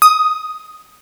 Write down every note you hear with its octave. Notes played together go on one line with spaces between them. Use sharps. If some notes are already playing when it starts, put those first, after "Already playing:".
D#6